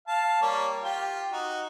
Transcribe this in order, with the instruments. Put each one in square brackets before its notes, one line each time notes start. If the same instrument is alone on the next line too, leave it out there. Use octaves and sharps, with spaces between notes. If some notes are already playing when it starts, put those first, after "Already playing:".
[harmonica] F5 A5
G3 A#3 C#5
F4 G4 G5
D#4 F#4